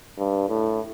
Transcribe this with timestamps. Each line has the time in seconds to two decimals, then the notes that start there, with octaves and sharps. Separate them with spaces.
0.18 G2
0.48 A2